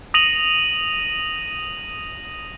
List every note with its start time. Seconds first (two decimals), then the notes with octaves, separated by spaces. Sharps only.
0.14 D#6 A#6 D#7 F7 F#7